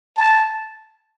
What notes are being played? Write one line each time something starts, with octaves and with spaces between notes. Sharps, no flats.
A5